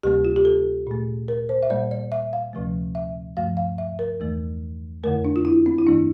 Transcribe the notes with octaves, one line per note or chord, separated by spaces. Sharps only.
D2 C3 G3 A#3 G4
F4
G4
A4
A#2 A3
A#4
C5
E5
A#2 G3 A#3 D5
D5
E5
F5
D2 C3 F3 A3
E5
G2 F3 A3 F5
F5
E5
A#4
E2 E3 A3
F2 D3 A3 A#4
D4
F4
E4
C4
E4
G2 E3 A#3 D4